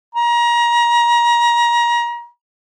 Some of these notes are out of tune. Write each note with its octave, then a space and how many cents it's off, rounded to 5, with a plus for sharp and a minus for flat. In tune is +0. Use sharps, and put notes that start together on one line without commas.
A#5 +30